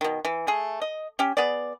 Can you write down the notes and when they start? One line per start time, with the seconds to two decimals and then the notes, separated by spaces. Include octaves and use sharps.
0.01 B2 D#3
0.25 E3
0.47 A3 G#4
0.82 D#5
1.19 C#4 G4
1.37 B3 G#4 D5